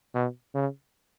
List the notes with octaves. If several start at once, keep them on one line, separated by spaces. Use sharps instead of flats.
B2
C#3